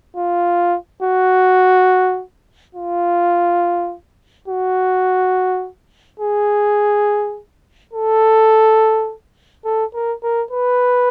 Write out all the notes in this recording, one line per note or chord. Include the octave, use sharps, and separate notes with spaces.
F4
F#4
F4
F#4
G#4
A4
A4
A#4
A#4
B4